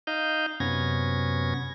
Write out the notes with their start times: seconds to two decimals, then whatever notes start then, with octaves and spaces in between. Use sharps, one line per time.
0.07 D#4 D#5 F5 G6
0.60 F#2 C3 B3 C#4 G#6 A#6